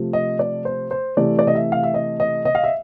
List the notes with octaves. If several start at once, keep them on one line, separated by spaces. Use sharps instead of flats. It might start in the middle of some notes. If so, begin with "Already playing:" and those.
Already playing: C3 F3 A3
D#5
D5
C5
C5
C3 E3 A3 D5
D5
D#5
E5
F5
E5
D#5
D#5
D#5
F5
E5